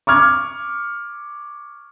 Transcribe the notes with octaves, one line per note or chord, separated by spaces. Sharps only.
C#6 D6 F6 G#6